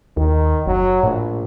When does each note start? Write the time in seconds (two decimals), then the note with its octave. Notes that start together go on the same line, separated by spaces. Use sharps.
0.17 D#2 D#3
0.67 F#1 F#3
1.03 A#1 A2